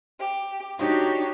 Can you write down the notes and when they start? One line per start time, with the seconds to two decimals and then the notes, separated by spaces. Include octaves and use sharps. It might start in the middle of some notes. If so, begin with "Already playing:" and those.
0.19 G4
0.79 D4 D#4 F#4 G4 C#5